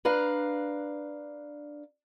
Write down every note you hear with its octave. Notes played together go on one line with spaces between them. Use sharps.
D4 B4 F5 A#5